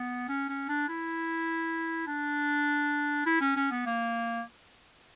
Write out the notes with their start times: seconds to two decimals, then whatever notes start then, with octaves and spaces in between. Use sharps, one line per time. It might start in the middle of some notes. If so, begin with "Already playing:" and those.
Already playing: B3
0.29 C#4
0.49 C#4
0.69 D4
0.88 E4
2.07 D4
3.26 E4
3.41 C#4
3.56 C#4
3.71 B3
3.86 A#3